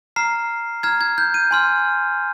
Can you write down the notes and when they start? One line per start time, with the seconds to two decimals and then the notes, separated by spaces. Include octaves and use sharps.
0.16 A#5 F6 C7
0.83 A#5 F6 G#6
1.01 G#6
1.18 G6
1.34 D#7
1.51 G#5 C6 F6